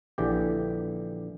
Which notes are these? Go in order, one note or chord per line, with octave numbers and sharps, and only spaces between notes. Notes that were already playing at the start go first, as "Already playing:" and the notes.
A#1 D3 E3 G4